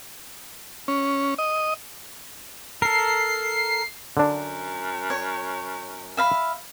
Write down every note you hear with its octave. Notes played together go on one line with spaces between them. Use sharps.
C#4
D#5
A4 A#4 C7
F#2 D3 D4
C#5
E5 F5 B5